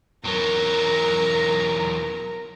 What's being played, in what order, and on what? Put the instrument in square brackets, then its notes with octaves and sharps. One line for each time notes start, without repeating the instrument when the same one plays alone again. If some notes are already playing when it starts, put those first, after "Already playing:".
[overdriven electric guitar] E2 F#3 [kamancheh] A#4 A#5